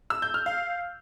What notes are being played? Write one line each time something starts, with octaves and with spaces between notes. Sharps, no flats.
E6
G6
F6
F5